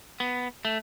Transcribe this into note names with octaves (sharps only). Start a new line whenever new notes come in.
B3
A3